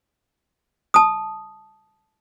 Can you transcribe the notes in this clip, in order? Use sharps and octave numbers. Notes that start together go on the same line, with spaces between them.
A5 D#6